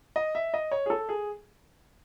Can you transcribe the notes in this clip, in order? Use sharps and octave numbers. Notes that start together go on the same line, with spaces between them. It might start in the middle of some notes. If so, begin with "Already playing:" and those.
D#5
E5
D#5
C#5
G#4
A4
G#4